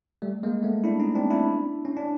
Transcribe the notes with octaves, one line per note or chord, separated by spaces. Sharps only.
G3 A3
G#3 A#3
A3 B3
D4 E4
C#4 D#4
C4 D4
D4 E4
C#4
D4